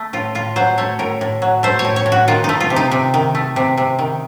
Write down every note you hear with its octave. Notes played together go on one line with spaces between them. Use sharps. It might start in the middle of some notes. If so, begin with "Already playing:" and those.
Already playing: A3
A2 F4
A2 F4
F#3 C5
A3 C#5
A2 A#4
A2
F#3
A3 C5
C#5
A2
C#5
A2
F#4
D#3 F4
A3 D#4
F4
C3
D#4
C3
D#3
A3
C3
C3
D#3